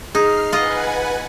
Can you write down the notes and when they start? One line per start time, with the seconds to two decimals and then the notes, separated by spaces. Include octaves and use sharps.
0.15 D#4 G#4 F6 C7
0.52 F4 B4 D#5 F#5 G#5